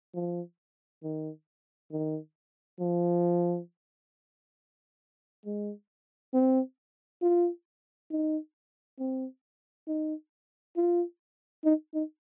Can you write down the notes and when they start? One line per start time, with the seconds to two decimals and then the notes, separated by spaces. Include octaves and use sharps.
0.14 F3
1.03 D#3
1.91 D#3
2.80 F3
5.45 G#3
6.34 C4
7.22 F4
8.10 D#4
8.99 C4
9.88 D#4
10.76 F4
11.64 D#4
11.94 D#4